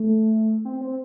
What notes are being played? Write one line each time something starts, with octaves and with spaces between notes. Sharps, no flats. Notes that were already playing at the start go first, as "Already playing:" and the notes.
Already playing: A3
C4
C4